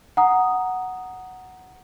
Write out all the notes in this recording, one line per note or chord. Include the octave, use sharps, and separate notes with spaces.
F#5 A#5 D#6